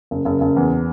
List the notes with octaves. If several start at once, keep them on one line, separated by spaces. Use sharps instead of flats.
F#1
F#1
F#1
E2